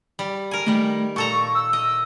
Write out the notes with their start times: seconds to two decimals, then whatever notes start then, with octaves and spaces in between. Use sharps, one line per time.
0.19 G3
0.51 A#4 G#5
0.66 D#3 G3 A3
1.16 A#2 A4 A#5 C#6
1.55 E6
1.73 D#5